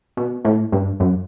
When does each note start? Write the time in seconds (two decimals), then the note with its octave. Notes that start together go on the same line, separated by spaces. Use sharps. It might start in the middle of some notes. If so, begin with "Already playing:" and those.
0.17 B2
0.45 A2
0.72 G2
1.00 F#2